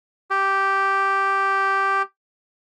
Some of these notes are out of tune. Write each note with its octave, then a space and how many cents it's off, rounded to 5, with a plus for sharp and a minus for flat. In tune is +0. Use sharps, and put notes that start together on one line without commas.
G4 -5